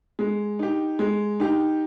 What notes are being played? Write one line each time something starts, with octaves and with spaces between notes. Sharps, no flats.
G#3
D#4 G4
G#3
D#4 G4